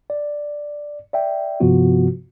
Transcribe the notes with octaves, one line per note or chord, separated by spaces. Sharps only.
D5
D5 E5 G5
G2 C3 F3 B3 F4 F#4